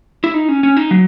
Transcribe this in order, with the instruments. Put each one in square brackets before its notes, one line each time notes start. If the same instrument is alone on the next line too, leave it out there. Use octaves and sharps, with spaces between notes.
[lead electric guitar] E4
D#4
C#4
C#4
D#4
F#3